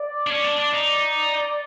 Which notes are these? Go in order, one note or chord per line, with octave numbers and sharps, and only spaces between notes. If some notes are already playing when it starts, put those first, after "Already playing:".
Already playing: D5
D4
C#4 D5
D4
D4
D#4 D5